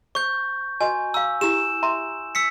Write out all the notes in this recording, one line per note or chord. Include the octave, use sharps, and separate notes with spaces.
C5 C#6 G6
F#4 B4 D#5 G#5
F5 A#5 E6
E4 G4 E7
E5 A#5 C6
E6 B6 C#7